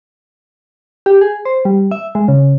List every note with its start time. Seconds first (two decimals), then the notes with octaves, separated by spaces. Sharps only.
1.06 G4
1.21 G#4
1.45 C5
1.65 G3
1.91 E5
2.15 G#3
2.28 C#3